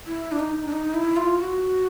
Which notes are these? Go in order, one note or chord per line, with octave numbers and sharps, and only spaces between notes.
E4
D4
D#4
D4
D#4
E4
F4
F#4